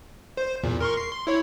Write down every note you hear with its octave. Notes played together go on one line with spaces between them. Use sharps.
C5
E2 A#2
A#4 C6 C#6
C7
C6
E4 C#5